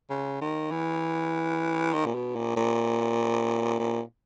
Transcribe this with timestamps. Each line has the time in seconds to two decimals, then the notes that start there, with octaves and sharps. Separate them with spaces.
0.10 C#3
0.41 D#3
0.71 E3
1.94 D#3
2.06 A#2
2.15 B2
2.35 A#2
2.56 A#2
3.79 A#2